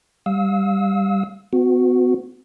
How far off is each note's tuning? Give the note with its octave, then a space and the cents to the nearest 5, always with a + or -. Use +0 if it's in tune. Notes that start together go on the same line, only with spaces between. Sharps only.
G3 +5 F5 +10 E6 -35
B3 +40 F#4 -15